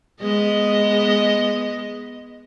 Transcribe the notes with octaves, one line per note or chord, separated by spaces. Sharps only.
G#3 B3 D#5